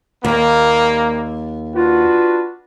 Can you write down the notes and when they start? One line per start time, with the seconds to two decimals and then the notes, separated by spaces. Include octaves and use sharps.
0.25 D#2 G3 A#3
1.76 D4 F4 F#4 B4